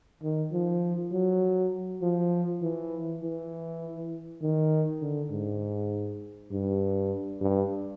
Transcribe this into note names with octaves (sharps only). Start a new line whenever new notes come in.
D#3
F3
F#3
F3
E3
E3
D#3
D3
G#2
G2
G2